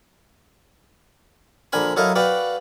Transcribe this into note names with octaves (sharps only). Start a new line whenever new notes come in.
A#1 D3 A#4 G#5 B5
F#3 E4 A4 A#4 D#5 F5
F#4 B4 D5 F5 G5